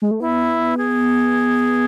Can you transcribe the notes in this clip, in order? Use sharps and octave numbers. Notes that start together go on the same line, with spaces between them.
G#3
A3
B3 E4
G#4